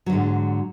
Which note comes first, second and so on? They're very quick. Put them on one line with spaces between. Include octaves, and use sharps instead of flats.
F#3 D3 G#2